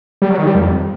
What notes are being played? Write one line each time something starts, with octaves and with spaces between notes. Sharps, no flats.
G3
F#3
D#3
G3
F2